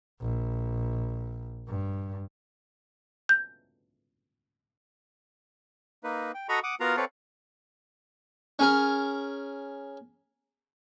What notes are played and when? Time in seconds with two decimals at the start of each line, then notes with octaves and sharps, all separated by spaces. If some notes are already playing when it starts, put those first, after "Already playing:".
0.21 A#1
1.68 G2
3.29 G6
6.04 A#3 D#4 B4
6.34 G5
6.49 F#4 A4 D#5 A#5 B5 C#6
6.63 F#5 D6 D#6
6.80 B3 F4 F#4 A#4 F5 A#5
6.97 C4 A4 B4 C#5 D5 F5
8.59 C#4 G#4 A#4